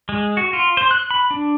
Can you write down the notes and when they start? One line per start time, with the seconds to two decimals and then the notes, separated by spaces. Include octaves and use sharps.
0.09 G#3
0.37 F#4
0.53 F4
0.77 C5
0.91 F#6
1.11 B5
1.31 D4